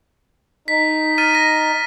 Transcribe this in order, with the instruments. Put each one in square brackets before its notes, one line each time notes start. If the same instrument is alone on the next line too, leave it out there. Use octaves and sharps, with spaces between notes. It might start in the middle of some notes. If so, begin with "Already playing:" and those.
[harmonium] D#4 [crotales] B6
[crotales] F6 A6 D#7
A#6